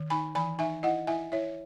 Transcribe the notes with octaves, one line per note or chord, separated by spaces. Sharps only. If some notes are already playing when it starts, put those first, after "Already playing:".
Already playing: D#3
D#4 G#5 B5
E3 G#5 B5
D#4 E5 G#5
E4 D#5 F#5
E4 E5 G#5
E4 C#5 E5